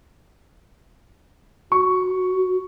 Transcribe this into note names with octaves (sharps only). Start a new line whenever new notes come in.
F#4 C#6